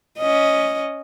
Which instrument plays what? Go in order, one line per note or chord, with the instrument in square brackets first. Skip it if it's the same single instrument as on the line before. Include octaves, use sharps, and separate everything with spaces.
[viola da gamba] C#4 D#5